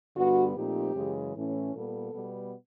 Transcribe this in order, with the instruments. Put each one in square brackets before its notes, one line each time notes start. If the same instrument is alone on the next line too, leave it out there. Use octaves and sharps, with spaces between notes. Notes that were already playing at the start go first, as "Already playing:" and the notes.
[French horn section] G2 D3 G3 B3 F#4
A#2 F3 A3 C4 D#4 G4
F#2 C#3 E3 G#3
A2 E3 A3 C#4
A#2 G3 B3 A4
B2 G3 B3